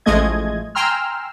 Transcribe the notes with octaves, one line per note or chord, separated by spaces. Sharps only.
A1 F3 G#3 A3 D#5 G#6
G5 G#5 A#5 C6 E6 F6